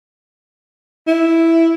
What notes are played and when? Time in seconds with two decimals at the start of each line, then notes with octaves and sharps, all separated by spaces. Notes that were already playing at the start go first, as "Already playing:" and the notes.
1.07 E4